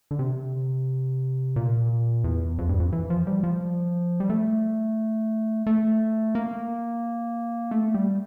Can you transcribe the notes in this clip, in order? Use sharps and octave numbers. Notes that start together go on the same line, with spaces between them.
D3
C3
A#2
E2
F2
G2
F2
E3
F3
G3
F3
G3
A3
A3
A#3
A3
G3